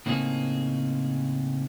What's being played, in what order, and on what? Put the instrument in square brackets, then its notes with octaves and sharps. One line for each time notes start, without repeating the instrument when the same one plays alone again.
[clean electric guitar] A2 C#3 A#3 C4 D#4 G#4